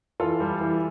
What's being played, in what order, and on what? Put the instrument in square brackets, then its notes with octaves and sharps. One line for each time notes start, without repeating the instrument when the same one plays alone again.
[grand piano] E3 [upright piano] F4 A4
[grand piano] G3
E3